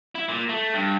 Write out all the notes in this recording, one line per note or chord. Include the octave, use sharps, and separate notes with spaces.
E4
A#2
A3
G2